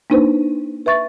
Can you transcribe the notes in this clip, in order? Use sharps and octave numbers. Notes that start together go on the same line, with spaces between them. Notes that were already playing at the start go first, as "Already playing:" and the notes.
A#3 D4 D#4 B4 C5
B4 E5 C#6 A6